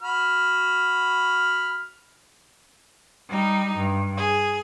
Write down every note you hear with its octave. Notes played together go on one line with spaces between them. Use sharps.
F#4 B5 F6
G3 D#4
G2
G#4